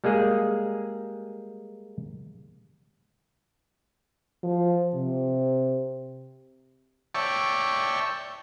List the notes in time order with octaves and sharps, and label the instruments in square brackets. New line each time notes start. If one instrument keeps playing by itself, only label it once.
[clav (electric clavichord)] G3 G#3 A#3 G#4
[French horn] F3
C3
[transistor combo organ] C#5 D5 E5 G5 A5 C#6